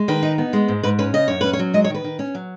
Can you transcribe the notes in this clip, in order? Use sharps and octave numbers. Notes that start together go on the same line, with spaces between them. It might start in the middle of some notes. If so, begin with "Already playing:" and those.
Already playing: G#3
D#3 B4
D#4
B3
G#3
G#2
G#2 B4
C#4 B4
C#3 D#5
F#2 C#5
C#4 B4
C#5
F#3
G#3 D#5
C#5
D#3 B4
D#3
C#4
F#3